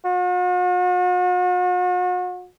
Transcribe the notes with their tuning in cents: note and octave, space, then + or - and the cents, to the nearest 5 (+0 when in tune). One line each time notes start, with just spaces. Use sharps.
F#4 -45